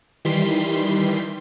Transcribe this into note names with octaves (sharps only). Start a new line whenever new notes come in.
D#3 E3 G3 C6 B6 C7